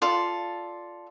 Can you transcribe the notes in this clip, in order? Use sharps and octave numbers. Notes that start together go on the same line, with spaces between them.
F4 A4 D5